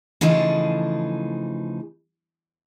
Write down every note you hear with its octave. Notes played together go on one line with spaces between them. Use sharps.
C#3 E3 F3 A3 D#4 G#4